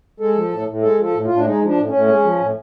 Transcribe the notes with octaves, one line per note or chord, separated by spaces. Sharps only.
G#3 A4
F3
A2
A2
G#3 A4
F3
A4
A2
A2 F4
D4
G#3 D#4
F3 D4
A2
A2 C#4
G#3
F3
A2